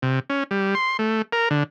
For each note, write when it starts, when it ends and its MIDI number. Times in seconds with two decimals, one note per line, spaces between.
0.02 0.19 48
0.30 0.44 61
0.51 0.75 55
0.75 0.97 84
0.99 1.22 57
1.33 1.49 70
1.51 1.63 50